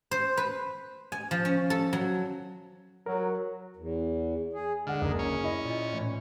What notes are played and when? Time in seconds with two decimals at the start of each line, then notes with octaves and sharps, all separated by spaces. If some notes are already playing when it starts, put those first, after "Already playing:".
0.11 C5
0.37 B4
1.12 G#5
1.31 F3
1.45 C#4
1.70 A4
1.93 F#3
3.06 F#3 A#4
3.76 E2
4.53 G#4
4.87 D3 G#3 G#4 F#5 F6
5.01 F#1 G#4 A#4
5.19 C#4
5.43 E4 D#5
5.64 A#2
5.92 A2 E3